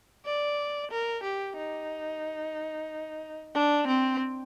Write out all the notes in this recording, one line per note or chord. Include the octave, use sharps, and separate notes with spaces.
D5
A#4
G4
D#4
D4
C4